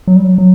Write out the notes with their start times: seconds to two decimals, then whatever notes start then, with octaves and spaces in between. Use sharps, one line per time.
0.08 F#3
0.16 G3
0.24 F#3
0.38 F#3